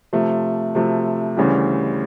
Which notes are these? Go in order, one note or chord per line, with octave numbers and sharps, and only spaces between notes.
C3 F3 A3
C3 F3 A3
D2 C#3 E3 G3